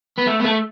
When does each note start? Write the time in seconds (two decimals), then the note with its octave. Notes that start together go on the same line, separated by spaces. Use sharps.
0.18 B3
0.27 A3
0.40 B3
0.45 A3